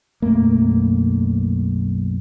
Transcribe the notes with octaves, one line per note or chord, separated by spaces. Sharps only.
B1 F#2 A3 A#3